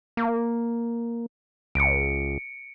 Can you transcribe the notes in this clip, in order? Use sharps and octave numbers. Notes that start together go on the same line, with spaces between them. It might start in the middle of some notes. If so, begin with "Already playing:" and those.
A#3
C#2 C#7 D7